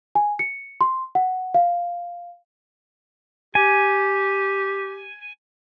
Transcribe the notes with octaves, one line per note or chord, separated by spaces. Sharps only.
G#5
C#7
C6
F#5
F5
G4 G#5